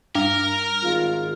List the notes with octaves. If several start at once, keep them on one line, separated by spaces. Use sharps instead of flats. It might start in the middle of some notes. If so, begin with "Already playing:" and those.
G2 A#4
G#1 F4